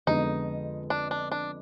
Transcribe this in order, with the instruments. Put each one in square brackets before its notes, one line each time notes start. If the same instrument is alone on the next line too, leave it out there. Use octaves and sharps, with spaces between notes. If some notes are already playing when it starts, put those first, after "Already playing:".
[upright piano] F2 D3 G#3 B3 [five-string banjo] D#4
[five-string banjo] D4
D4
D4